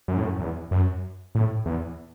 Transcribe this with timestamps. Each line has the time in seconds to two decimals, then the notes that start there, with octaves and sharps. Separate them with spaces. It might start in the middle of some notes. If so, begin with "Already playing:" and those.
0.08 F#2
0.17 A2
0.25 F#2
0.40 E2
0.71 F#2
1.35 A2
1.66 E2